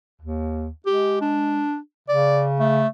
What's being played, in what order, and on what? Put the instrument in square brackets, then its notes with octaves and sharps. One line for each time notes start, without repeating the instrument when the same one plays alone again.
[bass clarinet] D#2
[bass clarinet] G#3 [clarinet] G4
[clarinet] D4
[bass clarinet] C#3 [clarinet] D5
[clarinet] A3